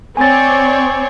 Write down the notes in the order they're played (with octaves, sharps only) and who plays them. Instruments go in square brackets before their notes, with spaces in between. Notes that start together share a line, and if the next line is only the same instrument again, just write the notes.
[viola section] C4 C#5 D5 [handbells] G#5 A6